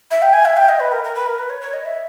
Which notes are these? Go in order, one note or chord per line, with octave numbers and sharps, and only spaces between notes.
E5
G5
G#5
E5
G5
D#5
B4
A#4
A#4
B4
A#4
B4
C#5
C#5
D#5
E5